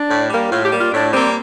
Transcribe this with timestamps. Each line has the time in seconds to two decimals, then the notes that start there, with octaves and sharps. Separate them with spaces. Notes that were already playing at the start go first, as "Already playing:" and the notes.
Already playing: D4
0.08 A2
0.29 G3
0.34 A#3
0.51 A2 F4
0.64 G4
0.72 G3 A#3
0.79 F4
0.91 A2 D4
1.13 G3 A#3 C4